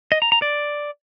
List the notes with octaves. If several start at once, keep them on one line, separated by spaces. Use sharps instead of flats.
D#5
A#5
A#5
D5